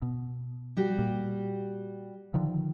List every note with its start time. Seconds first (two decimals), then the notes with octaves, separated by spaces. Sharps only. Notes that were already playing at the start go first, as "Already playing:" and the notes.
0.02 B2
0.77 G3 F#4 G4
0.99 A#2
2.34 D3 D#3 F3